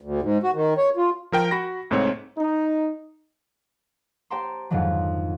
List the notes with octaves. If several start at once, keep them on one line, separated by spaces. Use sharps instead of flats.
D2
G#2
F#4
D#3
C#5
F4
F3 A#4 G5
F#4 B5 A#6
C2 G#2 A3 C4 C#5
D#4
G4 C5 G5 A5 A#5 C6
F2 G#2 D3 D#3 F#3